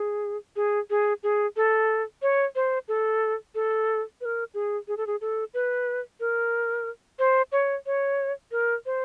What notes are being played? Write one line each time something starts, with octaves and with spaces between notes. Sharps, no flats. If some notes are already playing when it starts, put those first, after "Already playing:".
Already playing: G#4
G#4
G#4
G#4
A4
C#5
C5
A4
A4
B4
A#4
G#4
G#4
A4
G#4
A4
B4
A#4
C5
C#5
C#5
A#4
C5